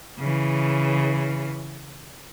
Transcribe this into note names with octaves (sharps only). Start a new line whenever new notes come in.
C#3 E3